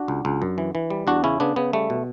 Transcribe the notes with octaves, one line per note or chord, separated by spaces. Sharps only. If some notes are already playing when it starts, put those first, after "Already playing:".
Already playing: D4 F#4
C#2
C#2
F#2
E3
E3
G3
E2 D4 F#4
C#3 C#4 E4
C#3 B3 D4
C#3 B3
G3 A3
B2